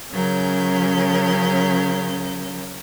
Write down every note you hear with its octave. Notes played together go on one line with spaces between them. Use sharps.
C#3 F#3 C#4 A#4 G6